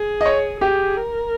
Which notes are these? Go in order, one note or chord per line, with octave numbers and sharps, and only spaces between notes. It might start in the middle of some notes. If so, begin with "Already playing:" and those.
Already playing: G#4
D#5
C#5
G4 G#4
A#4